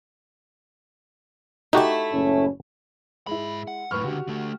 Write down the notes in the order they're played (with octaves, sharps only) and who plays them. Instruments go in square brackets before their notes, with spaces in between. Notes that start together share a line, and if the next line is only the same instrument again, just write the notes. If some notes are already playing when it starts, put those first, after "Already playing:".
[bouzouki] A3 E4 [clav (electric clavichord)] D#4 F#4 G4
[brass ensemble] F#1 A2 C#4
[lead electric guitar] G#2 B5 [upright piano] G#3 E4
[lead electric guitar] F#5
[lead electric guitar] F#2 A2 [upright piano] B4 C#6 F6
[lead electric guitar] C#2 D3 [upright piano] F#4 G4
[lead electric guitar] D3 A3